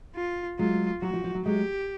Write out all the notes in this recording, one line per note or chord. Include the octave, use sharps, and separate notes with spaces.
F4
F#3 G#3 F4
F#3 F#4
F3
F3
F#3
F#3 G#3 G4